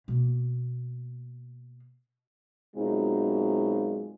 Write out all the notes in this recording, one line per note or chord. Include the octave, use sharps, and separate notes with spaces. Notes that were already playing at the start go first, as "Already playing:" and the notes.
B2 A#3
F#2 B2 G#3 C4 D#4 F4